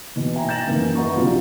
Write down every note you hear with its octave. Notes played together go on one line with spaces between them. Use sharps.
B2 E3
E5 G5 G#5 A#5
G6 A6 A#6 E7 F#7
F#2 D#3 E3 A#3
E4 B4 D#5 F#5 A#5 C#6
A#1 C3 F#3 F4 G4 D5